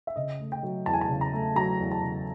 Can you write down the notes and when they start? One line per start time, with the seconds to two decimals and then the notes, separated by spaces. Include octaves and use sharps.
0.07 E5
0.16 C#3 D#5
0.40 A3
0.52 G5
0.63 F#3
0.86 E2 A5
0.94 G#5
1.01 A5
1.09 C#3
1.21 A#5
1.33 A3
1.56 F#3 A#5
1.79 E2
1.91 A5
2.03 C#3